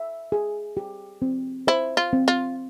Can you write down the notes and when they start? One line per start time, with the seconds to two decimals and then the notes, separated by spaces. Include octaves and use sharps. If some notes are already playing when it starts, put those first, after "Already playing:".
Already playing: E5
0.32 G#4
0.77 G4
1.22 C4
1.67 E4 C5
1.97 F4
2.13 C4
2.28 F4